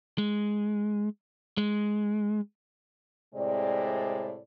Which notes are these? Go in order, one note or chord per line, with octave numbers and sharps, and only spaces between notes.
G#3
G#3
A2 C3 G#3 C4 D5